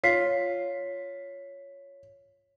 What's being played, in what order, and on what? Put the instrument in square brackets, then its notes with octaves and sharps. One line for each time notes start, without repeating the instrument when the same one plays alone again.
[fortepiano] F4 [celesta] C#5 B6 C7